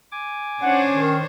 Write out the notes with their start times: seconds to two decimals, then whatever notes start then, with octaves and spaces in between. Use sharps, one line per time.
0.12 G#5 D6
0.62 C#4 D4 C5 C#5 F#5
0.95 D#3